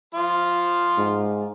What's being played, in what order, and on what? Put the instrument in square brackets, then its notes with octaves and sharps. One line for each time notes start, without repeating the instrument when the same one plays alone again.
[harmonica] F3 F4
[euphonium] G#2